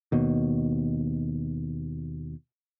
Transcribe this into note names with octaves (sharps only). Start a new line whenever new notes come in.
D#2 B2